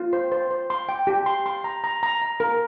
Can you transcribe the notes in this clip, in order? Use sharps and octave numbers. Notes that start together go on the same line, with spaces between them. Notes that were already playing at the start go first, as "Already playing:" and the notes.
Already playing: F4
C5
C5
C5
C6
G5
G4
C6
C6
A#5
A#5
A#5
A#5
A#4